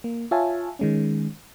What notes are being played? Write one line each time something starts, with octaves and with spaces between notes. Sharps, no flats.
A#3
F4 C#5 E5 F5 G#5 A5
D#3 G#3 C#4